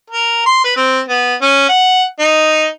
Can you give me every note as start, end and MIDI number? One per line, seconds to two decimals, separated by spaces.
0.10 0.42 70
0.46 0.64 84
0.64 0.72 71
0.76 1.00 60
1.08 1.34 59
1.42 1.66 61
1.69 2.03 78
2.20 2.67 63